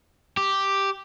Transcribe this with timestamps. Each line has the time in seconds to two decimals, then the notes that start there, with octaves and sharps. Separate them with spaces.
0.37 G4